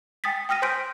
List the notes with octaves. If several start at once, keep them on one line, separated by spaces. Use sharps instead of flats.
G5 G#5 D#6 A6 B6
G5 D#6 F6 A#6 D#7
C5 G#5 C6 G6 B6 D7